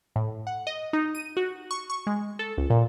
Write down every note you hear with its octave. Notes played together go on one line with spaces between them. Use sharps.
A2
F#5
D#5
D#4
D#7
F#4
C#6
C#6
G#3
A4
C#2
A#2